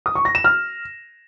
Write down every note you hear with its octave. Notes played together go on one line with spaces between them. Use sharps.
D#6
C#6
A#6
E7
F6